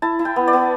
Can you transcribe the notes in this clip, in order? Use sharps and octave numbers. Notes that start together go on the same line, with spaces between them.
E4 A5
E4
G5
B3
D5
B3